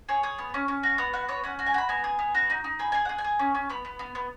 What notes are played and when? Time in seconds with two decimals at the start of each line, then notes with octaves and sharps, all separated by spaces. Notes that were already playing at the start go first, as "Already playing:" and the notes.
0.09 G#4 C#5
0.23 G#4
0.39 B3
0.54 C#4
0.68 C#4
0.83 F#4
0.98 B3 F#5
1.13 F#4 F#5
1.28 B3 C#5
1.44 C#4 F#5
1.59 F#4
1.66 G#5
1.74 F#4 B5
1.89 B3 G#5
2.04 G#4
2.19 B3
2.35 F#4
2.50 D#4
2.64 D#4
2.79 G#4 B5
2.92 G#4 G#5
3.05 G#4 F#5
3.18 G#5
3.24 G#4
3.39 C#4
3.55 C#4
3.70 B3 B5
3.85 B3
3.99 B3
4.15 B3